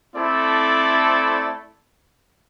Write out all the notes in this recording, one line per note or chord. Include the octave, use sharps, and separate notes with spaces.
A3 C4 E4 A4 D5